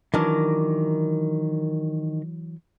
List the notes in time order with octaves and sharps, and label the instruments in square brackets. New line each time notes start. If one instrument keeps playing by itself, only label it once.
[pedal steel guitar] D#3 A#4 D6 [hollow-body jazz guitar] E3 F#3 D4